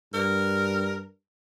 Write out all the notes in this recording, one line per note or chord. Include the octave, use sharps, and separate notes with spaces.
G2 A#4